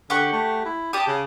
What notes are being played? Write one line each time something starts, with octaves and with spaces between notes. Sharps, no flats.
D3 G4 F#5 C#6
A3
E4
G4 A5 D6 D#6
C#3